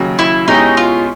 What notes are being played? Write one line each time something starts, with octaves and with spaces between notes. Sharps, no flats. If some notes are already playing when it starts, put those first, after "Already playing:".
Already playing: D#2 C#3 F#3
E4
B2 G#3 C#4 D#4 E4 G4
F4